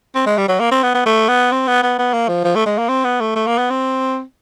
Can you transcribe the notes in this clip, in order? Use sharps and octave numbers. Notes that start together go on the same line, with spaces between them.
C4
G#3
G3
F#3
A#3
C4
B3
B3
A3
B3
C4
B3
B3
B3
A#3
F3
F3
A3
G#3
A#3
C4
B3
A3
A3
A#3
B3
C4